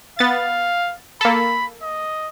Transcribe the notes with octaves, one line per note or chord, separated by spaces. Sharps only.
B3 F5 A6
A#3 A4 B5
D#5